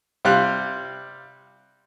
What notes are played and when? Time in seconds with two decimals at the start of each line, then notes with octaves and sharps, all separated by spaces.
0.25 C3 G3 F5 F#6